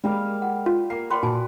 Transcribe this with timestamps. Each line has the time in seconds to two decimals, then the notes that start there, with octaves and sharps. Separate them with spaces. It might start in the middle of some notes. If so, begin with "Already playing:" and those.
0.04 G3 G#3 A#3 F5
0.42 F#5
0.66 F4
0.90 A#3 A#4 C7
1.10 B4 D5 G5 C6
1.23 A#2 F#4 G#5 A5